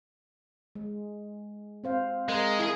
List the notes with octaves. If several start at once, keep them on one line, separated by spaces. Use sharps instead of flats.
G#3
C4 C5 F5
G#3 A#4
E4 G#4 A#4